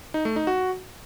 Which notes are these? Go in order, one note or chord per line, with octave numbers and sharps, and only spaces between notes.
D#4
A3
D#4
F#4